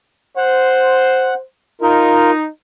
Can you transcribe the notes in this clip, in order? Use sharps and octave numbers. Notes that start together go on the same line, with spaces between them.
C5 F#5
D#4 F4 A#4